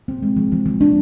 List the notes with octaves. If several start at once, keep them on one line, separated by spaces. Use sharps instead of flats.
C4
G#3
F3
F3
F3
D4